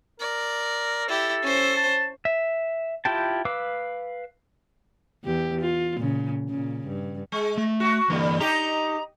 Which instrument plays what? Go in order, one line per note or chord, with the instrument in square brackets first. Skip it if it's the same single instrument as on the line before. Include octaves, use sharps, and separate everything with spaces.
[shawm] A#4 [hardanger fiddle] D5
[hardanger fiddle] E4 G4 [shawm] A4
[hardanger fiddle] C#4 C5
[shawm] A5
[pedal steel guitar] E5
E4 F4 G4 G5 A5
B4 F5 D6 E6
[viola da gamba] E2 G4
F4
A#2 C#3
A#2 C#3
G2
[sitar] G#3
[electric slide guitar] A3
[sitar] F#4
[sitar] D3 G3 [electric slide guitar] E3 A#3
[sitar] D#4 G4 [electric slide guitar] A#5